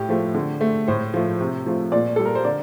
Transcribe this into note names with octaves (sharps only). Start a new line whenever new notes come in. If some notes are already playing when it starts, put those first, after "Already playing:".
Already playing: A2 G4
F3 A3
D3
A3
A2 C5
F3 A3
C3
F3 A3
A#2 D5
G3 A4
A#4
C5
D3 D5